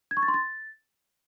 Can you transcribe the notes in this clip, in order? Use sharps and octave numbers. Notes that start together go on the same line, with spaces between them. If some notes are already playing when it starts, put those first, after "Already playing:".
G#6
C#6
A6
C6
A6